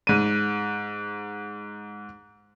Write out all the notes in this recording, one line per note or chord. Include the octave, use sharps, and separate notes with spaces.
G#2 D#7